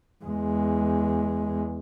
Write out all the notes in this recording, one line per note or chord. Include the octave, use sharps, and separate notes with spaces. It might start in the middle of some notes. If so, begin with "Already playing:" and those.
E2 G#3